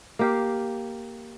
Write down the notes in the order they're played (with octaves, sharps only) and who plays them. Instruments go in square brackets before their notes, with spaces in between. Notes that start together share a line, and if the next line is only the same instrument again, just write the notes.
[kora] A#3 G4 F5